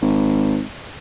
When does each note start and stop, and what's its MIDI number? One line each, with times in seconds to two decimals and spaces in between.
0.02 0.61 32